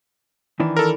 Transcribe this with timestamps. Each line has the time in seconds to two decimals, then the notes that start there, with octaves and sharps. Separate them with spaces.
0.60 D#3 E3 D4
0.77 A4 A#4